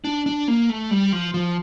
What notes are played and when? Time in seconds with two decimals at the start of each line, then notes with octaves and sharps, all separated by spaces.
0.04 D4
0.26 D4
0.48 A#3
0.70 A3
0.91 G3
1.12 F3
1.34 F3